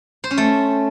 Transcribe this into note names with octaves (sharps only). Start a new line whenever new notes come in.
C5
C#4
A3